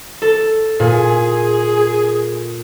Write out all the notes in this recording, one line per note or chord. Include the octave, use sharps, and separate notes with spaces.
A4
A#2 G#4